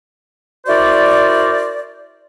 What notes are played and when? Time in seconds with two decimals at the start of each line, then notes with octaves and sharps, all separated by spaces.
0.66 E4 F#4 A#4 C5 D5